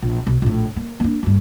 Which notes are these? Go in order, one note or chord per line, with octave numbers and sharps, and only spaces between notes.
A#1
B1
A#1 A2
A#3
A#3 D4
F#1 G2